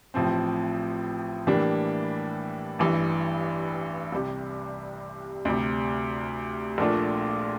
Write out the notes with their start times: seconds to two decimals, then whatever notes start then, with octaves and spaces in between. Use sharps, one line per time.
0.14 A1 A2 F3 C4
1.47 A2 E3 G3 A#3 D4
2.79 A1 G2 E3
4.12 C2 C3 G3
5.45 D2 C3 G3
6.78 A#1 A#2 A3 D4 F4